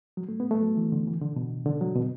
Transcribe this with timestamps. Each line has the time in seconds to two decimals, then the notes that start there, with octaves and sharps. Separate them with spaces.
0.17 F#3
0.29 A3
0.40 B3
0.51 A3
0.62 F#3
0.77 E3
0.92 D3
1.07 E3
1.22 D3
1.36 B2
1.66 D3
1.81 F#3
1.96 B2